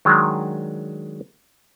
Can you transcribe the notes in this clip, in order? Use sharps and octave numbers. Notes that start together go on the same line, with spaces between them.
D#3 F#3 G#3 D4